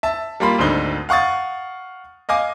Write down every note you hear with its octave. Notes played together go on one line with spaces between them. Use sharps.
E5 A5
G3 A#3 F4 B5
G#1 D2 D3 D4 D#4 G7
F5 F#5 C#6 D#6 A6
D#5 F5 G#5 D6